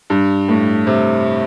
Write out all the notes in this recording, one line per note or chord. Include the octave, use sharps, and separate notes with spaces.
G2
A2
C3